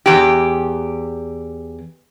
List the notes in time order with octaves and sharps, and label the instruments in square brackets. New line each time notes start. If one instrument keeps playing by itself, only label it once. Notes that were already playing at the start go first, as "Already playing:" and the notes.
[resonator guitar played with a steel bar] E2 G4